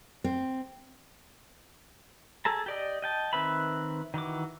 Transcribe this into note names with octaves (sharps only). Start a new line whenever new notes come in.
C4
G#4 A4 A5 A#5
G4 D5 D#5
D#5 G5 A5
D#3 C4 B4 E5 B5
D#3 E3 F#4 D6